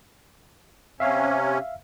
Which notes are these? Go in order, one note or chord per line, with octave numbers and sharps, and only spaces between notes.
C3 C#4 E5 F5